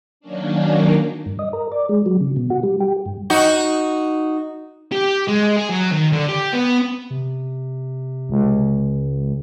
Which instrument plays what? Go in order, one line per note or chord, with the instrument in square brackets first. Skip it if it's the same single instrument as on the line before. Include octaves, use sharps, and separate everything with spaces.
[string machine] D#3 F#3 A#3 C#4 D4
[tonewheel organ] G2
D#5
A#4
D5
G#3
F#3
C#3
B2
F#4
G3
G4
G2
[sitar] D#4 F#4
[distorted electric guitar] G4
G#3
G#4
F#3
D#3
D3
G4
B3
[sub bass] C3
[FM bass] C#2